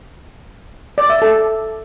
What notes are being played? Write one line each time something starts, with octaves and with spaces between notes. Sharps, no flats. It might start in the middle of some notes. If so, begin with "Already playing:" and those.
D5
E5
A4